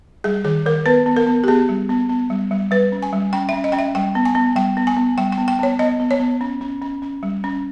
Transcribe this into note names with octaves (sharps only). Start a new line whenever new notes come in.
G3 G#4
D#3 G#4
D#3 A#4
B3 B4
B3
A#4
B3
G4
B3 G#4
G3
B3
B3
G3
G3
G3 B4
C#4
G#5
G3
C#4 G5
C#4 E5
D#5
C#4 G5
E5
G3 G5
B3
G#5
B3
G3 G5
B3
G#5
B3
G3 G5
G5
B3
G5
B3 C#5
B3 D#5
B3
C#5
B3
C#4
C#4
C#4
C#4
G3
C#4